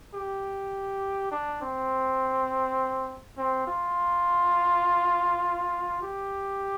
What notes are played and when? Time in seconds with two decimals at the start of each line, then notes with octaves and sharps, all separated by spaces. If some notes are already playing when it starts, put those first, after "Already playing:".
0.14 G4
1.31 D4
1.61 C4
3.37 C4
3.67 F4
6.02 G4